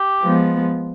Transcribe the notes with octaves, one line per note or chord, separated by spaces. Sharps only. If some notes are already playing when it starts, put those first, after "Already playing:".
Already playing: G4
F3 G#3 B3